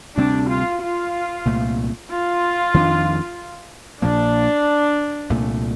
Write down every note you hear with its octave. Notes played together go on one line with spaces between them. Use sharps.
D2 C3 G3 C4 D4
F4
F4
C2 A#2 A3
F4
F2 D#3 A#3 D4
A#1 A#2 F3 A#3 D4
C2 A#2 A3